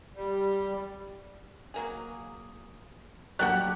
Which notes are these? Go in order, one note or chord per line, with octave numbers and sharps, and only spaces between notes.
G3
F#3 A#3 G#4
F#3 G3 A#3 D4 F#4 G4 F#5 F#6